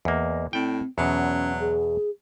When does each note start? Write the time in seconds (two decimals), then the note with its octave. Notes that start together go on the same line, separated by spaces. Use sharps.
0.05 E2 A#3 D#5
0.53 A2 C4 D5 G5
0.98 E2 B2 F#3 C#4
1.60 G#4